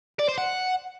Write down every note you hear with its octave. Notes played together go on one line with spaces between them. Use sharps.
D5
C5
F#5